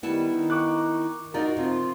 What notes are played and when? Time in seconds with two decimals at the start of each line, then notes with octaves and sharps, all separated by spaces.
0.03 D#3 G3 B3 E4 A5
0.32 D#3 D#4
0.50 C#6 D6 F#6
1.34 D#4 F4 F#4 A#4 D5
1.57 C3 F3 F4